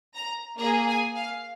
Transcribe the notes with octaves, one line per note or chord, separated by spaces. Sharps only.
A#5
A#3 G#4 A#5
G#5
F5